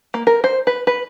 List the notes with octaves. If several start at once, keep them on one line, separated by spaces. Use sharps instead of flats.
A#3
A#4
C5
B4
B4